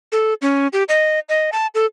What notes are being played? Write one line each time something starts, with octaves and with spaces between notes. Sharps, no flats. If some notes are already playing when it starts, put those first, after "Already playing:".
A4
C#4
G4
D#5
D#5
A5
A4